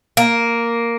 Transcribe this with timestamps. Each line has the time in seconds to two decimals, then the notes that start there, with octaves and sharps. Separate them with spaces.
0.17 A#3